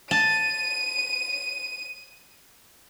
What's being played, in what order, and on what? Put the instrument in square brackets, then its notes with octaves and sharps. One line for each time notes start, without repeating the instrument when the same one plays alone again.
[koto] A5 [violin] D#7